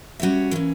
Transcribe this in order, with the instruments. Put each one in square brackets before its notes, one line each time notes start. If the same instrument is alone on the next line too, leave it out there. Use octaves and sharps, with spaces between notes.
[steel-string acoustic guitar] G3 C#4 F#4 C#5 E5
E3 A#3 C#4